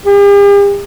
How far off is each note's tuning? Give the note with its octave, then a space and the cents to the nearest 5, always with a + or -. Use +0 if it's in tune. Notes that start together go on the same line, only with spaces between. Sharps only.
G4 +45